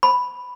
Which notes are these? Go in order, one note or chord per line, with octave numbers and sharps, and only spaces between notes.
B5